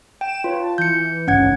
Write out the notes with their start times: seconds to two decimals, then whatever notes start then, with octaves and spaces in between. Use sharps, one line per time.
0.21 G5 E7
0.44 F4 B4 C#5
0.60 A5
0.78 E3 G6 C#7
1.27 G#1 C#2 G2 C#4 F#5 G#6